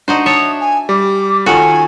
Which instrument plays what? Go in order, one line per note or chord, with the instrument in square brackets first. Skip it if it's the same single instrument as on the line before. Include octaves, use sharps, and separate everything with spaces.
[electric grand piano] D4 [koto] D#4 F#4 C5
[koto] C#5 E5 A5 [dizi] D#6
[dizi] G#5
[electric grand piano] G3 [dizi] D6
[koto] D#3 C#4 F#4 [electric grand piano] F4 A4 [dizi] G#5